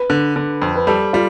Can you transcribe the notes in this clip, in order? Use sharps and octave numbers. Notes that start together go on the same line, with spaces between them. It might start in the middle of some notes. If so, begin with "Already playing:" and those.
Already playing: B4
D3
D3
F2
B4
G3 A4
G3 F4